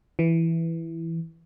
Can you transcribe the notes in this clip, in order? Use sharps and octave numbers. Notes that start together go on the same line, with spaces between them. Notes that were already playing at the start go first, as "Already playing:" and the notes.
E3